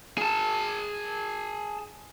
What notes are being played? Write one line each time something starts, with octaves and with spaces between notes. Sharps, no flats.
G#4 A5